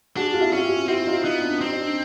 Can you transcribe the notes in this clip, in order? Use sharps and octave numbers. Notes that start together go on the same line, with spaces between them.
D4 F#4 G#4
F4
E4 F#4
C#4 F#4
F4 G4
C4 E4 F#4
D#4 F4
B3 D#4
D4
C4 D#4
D#4
D4